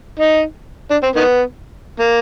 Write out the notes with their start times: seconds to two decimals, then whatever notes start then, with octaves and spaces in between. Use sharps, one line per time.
0.19 D#4
0.91 D4
1.03 C4
1.16 D#3 B3
2.00 A#3